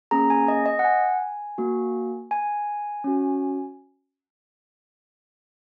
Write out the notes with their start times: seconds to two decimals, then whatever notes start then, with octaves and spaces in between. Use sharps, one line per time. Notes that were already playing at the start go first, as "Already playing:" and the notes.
0.11 A#3 C#4 G#4 A#5
0.30 G#5
0.48 D#5
0.66 D#5
0.79 F#5
0.85 G#5
1.58 A#3 F#4
2.31 G#5
3.04 C#4 F#4